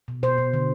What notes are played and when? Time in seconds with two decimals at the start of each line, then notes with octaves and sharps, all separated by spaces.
0.08 B2
0.23 B2 C5
0.38 B2
0.53 D3